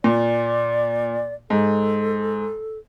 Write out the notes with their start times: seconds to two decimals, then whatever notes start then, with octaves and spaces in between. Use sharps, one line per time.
0.04 A#2 D5
1.50 G#2 A4